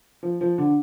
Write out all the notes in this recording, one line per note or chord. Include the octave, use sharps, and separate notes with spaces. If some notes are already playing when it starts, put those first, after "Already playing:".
F3
F3
D3